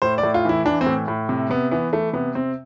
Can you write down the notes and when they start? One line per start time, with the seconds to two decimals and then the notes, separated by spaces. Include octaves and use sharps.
0.02 A2 C5
0.18 D5
0.23 A2
0.34 F4
0.45 E3 E4
0.65 E3 D4
0.81 C4
0.86 A2
1.08 A2
1.29 C3
1.50 C3 B3
1.71 E3 B3
1.93 E3 A3
2.13 C3 B3
2.35 C3 C4